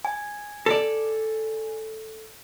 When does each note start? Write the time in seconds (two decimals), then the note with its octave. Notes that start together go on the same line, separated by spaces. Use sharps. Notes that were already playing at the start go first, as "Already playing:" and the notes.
0.05 G#5
0.66 A4 D5